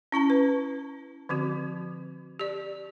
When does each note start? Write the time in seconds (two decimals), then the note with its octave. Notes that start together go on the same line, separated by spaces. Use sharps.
0.12 C#4 E4 A5 A#5
0.30 B4
1.29 D3 F3 C4 F#4
2.39 G4 D5